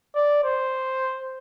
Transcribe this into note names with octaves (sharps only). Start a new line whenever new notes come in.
D5
C5